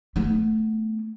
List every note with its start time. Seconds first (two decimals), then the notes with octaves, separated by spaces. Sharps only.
0.16 A3 B3